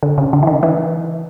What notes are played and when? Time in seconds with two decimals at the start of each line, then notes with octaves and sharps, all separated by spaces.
0.03 D3
0.18 C#3
0.33 D3
0.43 E3
0.47 D#3
0.63 E3